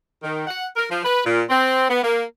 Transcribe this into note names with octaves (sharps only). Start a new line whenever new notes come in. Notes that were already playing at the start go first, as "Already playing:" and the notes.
D#3
F#5
A#4
F3
B4
A#2
C4
B3
A#3